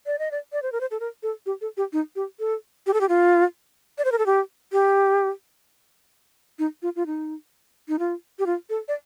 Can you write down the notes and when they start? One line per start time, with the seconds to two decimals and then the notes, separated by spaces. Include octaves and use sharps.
0.06 D5
0.19 D#5
0.31 D5
0.53 D5
0.63 C5
0.72 A#4
0.81 C5
0.91 A4
1.00 A#4
1.23 A4
1.46 G4
1.61 A4
1.77 G4
1.93 D#4
2.16 G4
2.39 A4
2.87 G4
2.94 A4
3.01 G4
3.09 F4
3.98 D5
4.05 C5
4.12 A#4
4.18 A4
4.26 G4
4.72 G4
6.59 D#4
6.82 F4
6.96 F4
7.06 D#4
7.88 D#4
7.99 F4
8.39 G4
8.46 F4
8.70 A4
8.88 D5